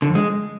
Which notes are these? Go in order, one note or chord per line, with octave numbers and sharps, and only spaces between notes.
D3
F2
G#3